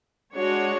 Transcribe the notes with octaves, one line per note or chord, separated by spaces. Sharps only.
G#3 D4 F#4 C#5